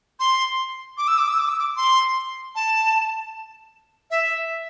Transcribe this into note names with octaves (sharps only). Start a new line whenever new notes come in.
C6
D6
E6
D6
E6
D6
E6
D6
C6
A5
E5